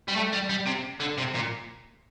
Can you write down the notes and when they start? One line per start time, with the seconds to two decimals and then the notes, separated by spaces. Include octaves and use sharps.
0.08 G3
0.16 A3
0.33 G3
0.49 G3
0.66 C3
1.00 D3
1.18 C3
1.34 A#2